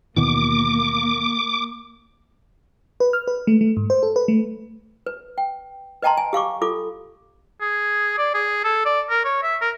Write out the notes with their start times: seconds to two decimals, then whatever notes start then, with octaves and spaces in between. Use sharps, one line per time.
0.17 D#2 B2 E3 A#3 D6
3.00 B4
3.13 F6
3.27 B4
3.47 A3
3.61 A3
3.77 G#2
3.90 C5
4.03 A4
4.16 B4
4.28 A3
5.06 B4
5.38 G5
6.02 B4 D#5 G5 A5 A#5 C6
6.17 G#5
6.33 G4 F5 C#6 D6
6.62 F4 A4 D6
7.61 G#4
8.18 D5
8.34 G#4
8.64 A4
8.85 D5
9.10 A#4
9.25 C#5
9.43 E5
9.61 A#4